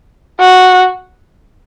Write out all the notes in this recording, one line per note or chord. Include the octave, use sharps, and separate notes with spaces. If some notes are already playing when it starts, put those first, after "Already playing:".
F#4